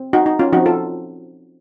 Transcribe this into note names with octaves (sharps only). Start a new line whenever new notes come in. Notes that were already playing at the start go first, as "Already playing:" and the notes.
Already playing: C4
D#4 F#4
D#4
C#4 F4
F3 C4 D#4 F#4
F4 A4